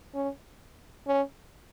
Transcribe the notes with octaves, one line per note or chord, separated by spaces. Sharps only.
C#4
C#4